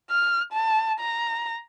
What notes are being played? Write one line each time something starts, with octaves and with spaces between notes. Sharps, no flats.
F6
A5
A#5